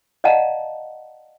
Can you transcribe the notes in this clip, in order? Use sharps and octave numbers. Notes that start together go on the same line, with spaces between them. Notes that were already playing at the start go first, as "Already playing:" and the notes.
D5 D#5 F5 F#5 A5 A#5